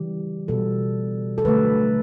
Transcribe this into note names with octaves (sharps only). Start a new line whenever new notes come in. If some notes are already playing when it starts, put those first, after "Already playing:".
Already playing: C#3 E3 G3 G4
B2 G3 A4
A4
D3 F#3 A3 B4